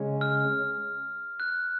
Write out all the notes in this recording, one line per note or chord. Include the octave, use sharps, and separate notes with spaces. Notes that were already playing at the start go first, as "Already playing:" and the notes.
Already playing: C#3 G#3 C#4
F6
F#6